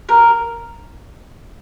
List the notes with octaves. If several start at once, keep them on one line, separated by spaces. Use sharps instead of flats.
A#4